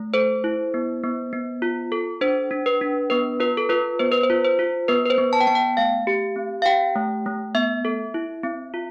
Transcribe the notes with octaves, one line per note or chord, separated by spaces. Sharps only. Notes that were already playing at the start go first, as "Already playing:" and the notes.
Already playing: A3
A4 C5
E4
B3
B3
B3
F4
A4
D4 C5
D4
B4
D4
B3 B4
F4 B4
A4
F4 B4
B3 C5
B4
C5
F4
C5
F4
B3 B4
B4
C5
B3
A5
G5
B3 A5
G5
A3 F5
G4
C4
F5
G4 G5
A3
A3
B3 E5
A4
E4
C4
F4